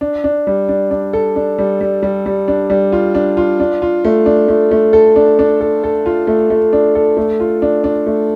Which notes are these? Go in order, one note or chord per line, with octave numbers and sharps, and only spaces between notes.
D4
D4
G3
D4
D4
A4
D4
G3
G3
G3
G3
D4
G3
F4
D4
F4
D4
F4
A3
D4
A3
A3
A4
D4
D4
A4
A4
F4
A3
A3
D4
A4
A3
F4
D4
D4
A3